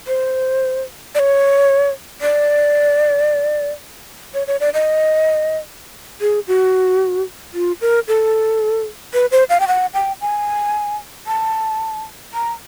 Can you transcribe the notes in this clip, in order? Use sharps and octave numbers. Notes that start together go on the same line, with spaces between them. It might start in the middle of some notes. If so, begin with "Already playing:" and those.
C5
D5
C#5
D5
C#5
C#5
D5
D#5
G#4
F#4
F4
A#4
A4
B4
C5
F5
G5
F#5
G5
G#5
A5
A#5